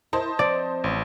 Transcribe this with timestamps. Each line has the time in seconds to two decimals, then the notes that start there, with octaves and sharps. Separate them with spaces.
0.13 E4 A#4 C5 D#5 A5
0.39 F3 C4 D5
0.84 A1